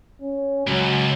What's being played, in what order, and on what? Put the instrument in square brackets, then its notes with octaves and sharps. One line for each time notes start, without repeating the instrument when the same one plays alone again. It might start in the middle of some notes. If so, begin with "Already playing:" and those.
[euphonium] C#4
[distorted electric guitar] C#2 [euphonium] F#3